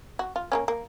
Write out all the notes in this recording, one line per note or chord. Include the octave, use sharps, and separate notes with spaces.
F#4
F4
A#3 B3 C#4
A#3